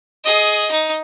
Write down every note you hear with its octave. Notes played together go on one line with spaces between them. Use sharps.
G#4 D#5
D#4